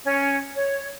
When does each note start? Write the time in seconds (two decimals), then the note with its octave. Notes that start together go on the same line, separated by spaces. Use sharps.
0.04 C#4
0.55 C#5